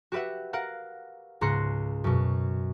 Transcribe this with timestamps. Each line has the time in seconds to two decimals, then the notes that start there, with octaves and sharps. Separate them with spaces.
0.12 F#4 G4 B4 E5 F#5
0.53 A#4 F5 F#5
1.41 C#2 G#2 A#5 C6 F#6 C#7
2.04 F#2 B2